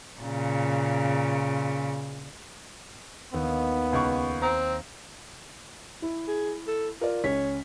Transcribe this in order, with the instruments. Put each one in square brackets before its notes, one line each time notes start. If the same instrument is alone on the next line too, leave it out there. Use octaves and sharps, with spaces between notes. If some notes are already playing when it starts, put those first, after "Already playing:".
[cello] A#2 C#3
[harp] D#2 [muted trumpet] B3
[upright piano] C#2 C#6
[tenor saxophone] C4 [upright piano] A#5
[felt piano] E4
[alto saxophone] G#4
A4
[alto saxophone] F4 [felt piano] A#4 D5
[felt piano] C#2 C#4 B6 [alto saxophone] C#5